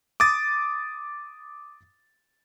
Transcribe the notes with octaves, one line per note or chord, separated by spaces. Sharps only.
D6 D#6 A6